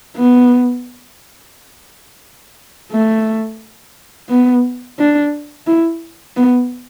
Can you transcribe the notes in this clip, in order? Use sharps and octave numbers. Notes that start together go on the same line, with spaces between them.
B3
A3
B3
D4
E4
B3